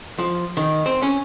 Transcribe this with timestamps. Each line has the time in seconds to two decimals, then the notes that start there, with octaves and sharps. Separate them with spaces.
0.19 F3
0.57 D#3
0.86 C4
1.02 C#4